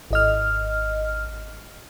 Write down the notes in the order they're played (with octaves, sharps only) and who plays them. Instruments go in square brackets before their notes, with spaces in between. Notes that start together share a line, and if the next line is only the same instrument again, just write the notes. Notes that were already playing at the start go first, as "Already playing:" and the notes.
[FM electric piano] G#1 D#5 F6